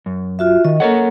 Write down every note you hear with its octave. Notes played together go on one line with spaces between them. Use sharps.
F#2
F4 F#4 E5
D#3 D#5
A#3 A4 A#4 C#5 F#5